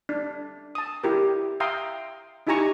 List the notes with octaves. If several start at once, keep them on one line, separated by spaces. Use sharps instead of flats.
D4
A5 D#6
E4 G4 A#4
E5 F5 G5 A#5 C6 D#6
D#4 E4 G4 G#5 A#5 C#6